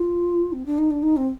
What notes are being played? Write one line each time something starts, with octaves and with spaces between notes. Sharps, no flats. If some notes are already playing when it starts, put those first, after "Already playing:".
Already playing: F4
C4
D4
D#4
D4
D#4
C4